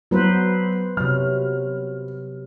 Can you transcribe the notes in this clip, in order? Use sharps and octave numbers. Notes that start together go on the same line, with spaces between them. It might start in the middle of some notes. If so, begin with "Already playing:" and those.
F#3 B3 B4 C5
C3 F#3 F6